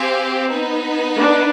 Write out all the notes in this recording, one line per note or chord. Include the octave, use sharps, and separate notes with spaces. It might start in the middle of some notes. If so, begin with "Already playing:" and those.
Already playing: C4 G4 C5 F5 G#5
B3 D#4 B4
D4